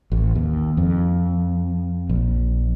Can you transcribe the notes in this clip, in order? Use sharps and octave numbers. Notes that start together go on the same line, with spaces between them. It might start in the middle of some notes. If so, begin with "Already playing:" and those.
A1
D#2
F2
A#1